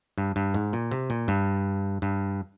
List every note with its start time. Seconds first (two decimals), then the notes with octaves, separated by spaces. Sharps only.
0.18 G2
0.36 G2
0.54 G#2
0.73 A#2
0.91 C3
1.10 A#2
1.28 G2
2.02 G2